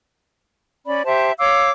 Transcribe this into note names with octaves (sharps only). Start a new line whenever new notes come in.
C#4 D5 B5
G4 C5 E5 A5
C#5 F5 D6 E6